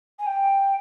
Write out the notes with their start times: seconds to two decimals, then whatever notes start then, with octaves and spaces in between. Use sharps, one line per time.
0.19 G#5
0.26 G5